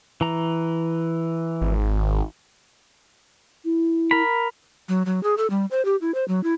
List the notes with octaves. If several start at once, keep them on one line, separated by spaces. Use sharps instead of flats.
E3 A#5
G#1
E4
A#4 B5
F#3
F#3
G#4
A4
G3
C5
G4
E4
C5
F#3
E4